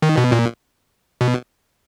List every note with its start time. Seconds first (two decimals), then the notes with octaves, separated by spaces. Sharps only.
0.02 D#3
0.17 B2
0.32 A#2
1.21 B2